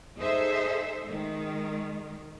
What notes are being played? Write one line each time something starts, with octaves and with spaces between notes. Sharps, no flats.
D#4 G#4 A4 C5 E5
D#3 G#3